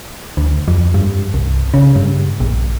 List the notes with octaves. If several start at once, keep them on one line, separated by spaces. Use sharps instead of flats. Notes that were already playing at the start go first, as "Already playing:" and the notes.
D2
F2
G2
C2
C#3
G2
A#1